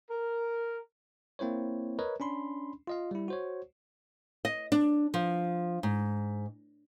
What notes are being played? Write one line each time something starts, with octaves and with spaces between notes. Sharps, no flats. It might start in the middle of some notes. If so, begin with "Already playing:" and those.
A#4
A#3 C4 E4 C5 C#5
A#4 B4 C#5 D#5
C#4 D4 B5 C6
F4 D#5 F5
G3 E4
F#4 C5 C#5
D#5
D4
F3
G#2